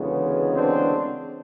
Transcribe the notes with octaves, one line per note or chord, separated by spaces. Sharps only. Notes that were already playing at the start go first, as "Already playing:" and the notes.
Already playing: D2 C#3 E3 G#3 B3
C4 D4